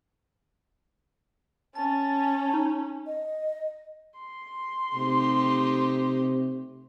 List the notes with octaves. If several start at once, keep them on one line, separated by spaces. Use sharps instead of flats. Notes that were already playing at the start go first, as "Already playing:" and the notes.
C#4 A5 A6
D#4
D#5
C6
C3 A3 D#4 G4